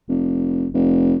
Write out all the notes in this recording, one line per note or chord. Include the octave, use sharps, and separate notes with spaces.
F1
F1